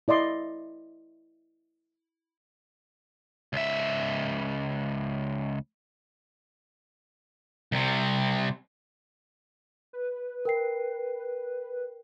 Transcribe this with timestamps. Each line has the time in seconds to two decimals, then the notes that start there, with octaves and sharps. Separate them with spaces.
0.08 E4 D5 D#5 C6
3.53 C#2 E5
7.72 C2 C3
9.93 B4
10.45 A#4 G5 C7